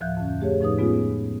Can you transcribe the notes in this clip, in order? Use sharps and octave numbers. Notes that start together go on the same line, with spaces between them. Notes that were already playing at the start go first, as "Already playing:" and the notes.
D2 A2 F3 E5 F#6 G6
F2 D3 C#4
A3 G4 G#4 C#5
A2 F3 D#4 B4 D#6
G#3 B3 C#4 F4 G#4